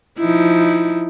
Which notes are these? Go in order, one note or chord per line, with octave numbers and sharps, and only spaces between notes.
F3 D#4 E4